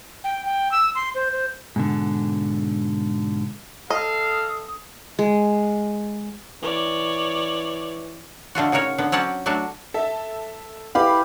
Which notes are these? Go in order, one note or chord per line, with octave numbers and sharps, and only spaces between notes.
G5
G5
E6
C6
C5
C5
G#2 B2 D3
A4 D#5 F5 D#6
G#3
E3 C#5 D5
D3 A3 F4 F#4
C#3 D#4 F#4 A#4 C#5
D3 B3
F#3 C4 C#4 D5 F#5 A5
F#3 A3 D4 F#4 A5
A4 E5
E4 G4 B4 F5 B5